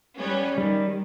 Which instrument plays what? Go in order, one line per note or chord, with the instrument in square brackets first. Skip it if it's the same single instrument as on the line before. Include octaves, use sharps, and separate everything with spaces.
[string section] G3 B3 C#4
[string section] D#3 [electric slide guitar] G3